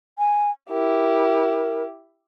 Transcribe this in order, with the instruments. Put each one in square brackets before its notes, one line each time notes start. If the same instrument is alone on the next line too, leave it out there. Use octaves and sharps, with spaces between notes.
[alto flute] G#5
[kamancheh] E4 G4 [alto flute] A#4